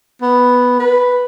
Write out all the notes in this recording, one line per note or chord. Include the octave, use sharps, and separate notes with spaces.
B3
B4